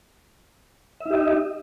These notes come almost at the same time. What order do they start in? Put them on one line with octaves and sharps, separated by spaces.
E5 D#4 G4 D#5